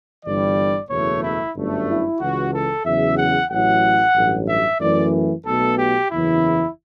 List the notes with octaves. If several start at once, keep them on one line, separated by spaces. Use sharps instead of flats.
G1 G2 E3 G3 D5
F#1 E2 B2 A3 C#5
E4
G1 F#2 D3 A3
E4
C#2 C#3 E3 F#4
A4
E2 C#3 F#3 E5
F#5
A1 A2 F#3 F#5
A1 G2 F#3
E5
F#2 E3 A3 D5
B1 B2 A3 A4
G4
F#1 E2 C#3 E3 E4